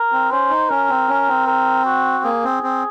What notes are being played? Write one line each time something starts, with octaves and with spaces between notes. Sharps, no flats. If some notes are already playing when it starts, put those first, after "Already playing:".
Already playing: A#4
C4
C#4 C5
D#4
C#4 A#4
C4
C#4
C4
A#4
F#4
A#3 G#4
C4
C4